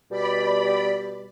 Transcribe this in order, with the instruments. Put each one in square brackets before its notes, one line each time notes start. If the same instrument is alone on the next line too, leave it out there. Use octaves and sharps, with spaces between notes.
[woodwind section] B2 G3 [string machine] D5 B5